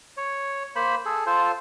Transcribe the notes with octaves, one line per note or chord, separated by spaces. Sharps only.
C#5
A#3 C5 B5
G#4 A4
F4 A4 C5